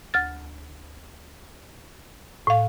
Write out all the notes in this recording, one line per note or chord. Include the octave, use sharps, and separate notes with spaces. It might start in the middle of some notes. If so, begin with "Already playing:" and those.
D2 F6 A6
A2 F5